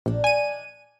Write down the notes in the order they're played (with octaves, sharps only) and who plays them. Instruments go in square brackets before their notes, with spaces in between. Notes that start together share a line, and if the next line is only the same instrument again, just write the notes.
[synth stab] A#1 [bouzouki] D#3 D4
[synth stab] G#5 D#7